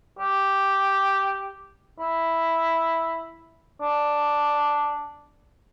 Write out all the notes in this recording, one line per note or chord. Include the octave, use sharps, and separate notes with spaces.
G4
E4
D4